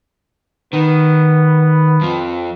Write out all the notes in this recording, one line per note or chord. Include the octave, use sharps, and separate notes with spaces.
D#3 B3
F2 F3